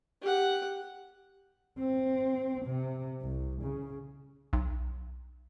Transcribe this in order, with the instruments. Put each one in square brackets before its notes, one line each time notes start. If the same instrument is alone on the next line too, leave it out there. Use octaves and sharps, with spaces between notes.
[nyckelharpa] G4 F#5
[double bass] C4
C3
C2
C#3
[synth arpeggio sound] B1